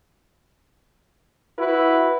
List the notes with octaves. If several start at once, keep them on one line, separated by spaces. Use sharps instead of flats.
E4 F#4 B4